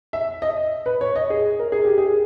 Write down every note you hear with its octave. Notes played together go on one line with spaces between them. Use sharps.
E5
D#5
B4
C#5
D#5
G#4
A#4
G#4
G4
G#4